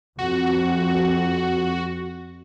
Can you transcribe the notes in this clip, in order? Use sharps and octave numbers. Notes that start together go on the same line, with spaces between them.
F2 F#4